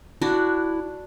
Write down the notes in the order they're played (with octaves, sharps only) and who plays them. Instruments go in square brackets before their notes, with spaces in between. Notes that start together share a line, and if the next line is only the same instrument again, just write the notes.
[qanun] D4 F#4 [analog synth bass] E4